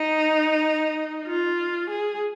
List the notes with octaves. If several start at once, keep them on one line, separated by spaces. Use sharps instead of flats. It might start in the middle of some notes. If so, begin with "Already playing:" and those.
Already playing: D#4
F4
G#4